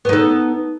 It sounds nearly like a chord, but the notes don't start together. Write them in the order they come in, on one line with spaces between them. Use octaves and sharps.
B3 D#4 A4